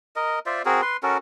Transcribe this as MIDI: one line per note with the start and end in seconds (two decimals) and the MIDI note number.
0.16 0.39 70
0.16 0.39 75
0.46 0.62 65
0.46 0.62 72
0.46 0.62 74
0.46 0.62 76
0.65 0.81 60
0.65 0.81 66
0.65 0.81 68
0.65 0.81 70
0.82 0.97 71
0.82 0.97 84
1.03 1.18 61
1.03 1.18 66
1.03 1.18 69
1.03 1.18 70